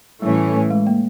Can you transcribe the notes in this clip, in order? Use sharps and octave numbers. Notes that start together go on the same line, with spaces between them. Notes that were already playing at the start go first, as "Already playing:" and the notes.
A2 E3 G3 A3 C#4
G#3
A#3